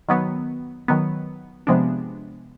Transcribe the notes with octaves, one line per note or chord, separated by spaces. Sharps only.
D#3 F#3 B3
D#3 F#3 B3
C3 F3 G#3 B3 D4